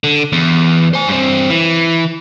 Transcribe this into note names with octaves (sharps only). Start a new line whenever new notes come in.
D3
E2
C5 G#5
G2 C4
E3